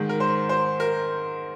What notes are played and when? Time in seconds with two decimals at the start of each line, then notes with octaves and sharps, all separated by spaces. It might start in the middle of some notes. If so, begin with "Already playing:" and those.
Already playing: G#2 D#3 G#3
0.09 A#4
0.20 C5
0.49 C5
0.80 A#4